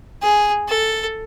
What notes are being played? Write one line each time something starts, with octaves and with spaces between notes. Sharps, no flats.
G#4
A4